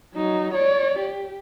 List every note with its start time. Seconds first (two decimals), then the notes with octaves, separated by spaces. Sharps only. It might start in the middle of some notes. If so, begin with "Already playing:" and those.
0.14 F#3 D#4
0.55 C#5 D5
0.99 G4